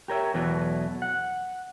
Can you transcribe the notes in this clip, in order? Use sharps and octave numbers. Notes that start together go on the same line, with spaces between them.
G4 A#4 C#5 E5
E2 B2 E3 F#3 A3
F#5